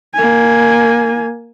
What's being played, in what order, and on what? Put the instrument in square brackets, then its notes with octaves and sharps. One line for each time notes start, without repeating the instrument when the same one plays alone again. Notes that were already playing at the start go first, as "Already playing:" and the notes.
[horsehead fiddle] A#3 G#5